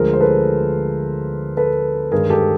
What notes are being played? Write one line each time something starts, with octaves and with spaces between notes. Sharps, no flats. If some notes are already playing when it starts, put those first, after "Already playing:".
Already playing: D2 D3 F3 G#3 A#4 C5
C5
A4 B4
A4 B4
G2 D#3 G#3 G#4 A#4
G4 A4